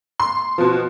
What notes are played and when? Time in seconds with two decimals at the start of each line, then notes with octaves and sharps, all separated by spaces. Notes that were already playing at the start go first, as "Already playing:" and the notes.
0.20 C6
0.58 B2 F3